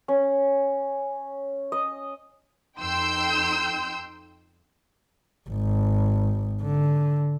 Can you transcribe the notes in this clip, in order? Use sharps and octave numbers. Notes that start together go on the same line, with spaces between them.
C#4
D#5
F2 D#4 G5 C6 E6 G6
G#1
D3